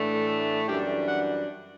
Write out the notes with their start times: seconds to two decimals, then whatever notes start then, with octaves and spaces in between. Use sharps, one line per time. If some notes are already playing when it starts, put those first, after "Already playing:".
Already playing: A2 E3 A3 D4
0.26 A4
0.67 F#2 E3 G3 D4 G4
1.07 F#5